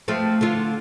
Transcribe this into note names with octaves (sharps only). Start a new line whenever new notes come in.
F3 A3 C4
D3 F4